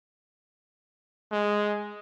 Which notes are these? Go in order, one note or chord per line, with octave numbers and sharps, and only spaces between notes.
G#3